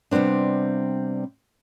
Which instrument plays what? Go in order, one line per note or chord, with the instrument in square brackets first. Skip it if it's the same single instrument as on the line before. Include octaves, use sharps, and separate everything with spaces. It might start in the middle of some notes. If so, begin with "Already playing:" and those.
[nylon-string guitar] C3 G3 B3 C4 D4